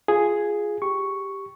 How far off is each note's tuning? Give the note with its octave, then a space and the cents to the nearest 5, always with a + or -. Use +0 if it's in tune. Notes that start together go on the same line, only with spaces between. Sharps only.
F4 +0 G#4 +0
G4 +0 C#6 +0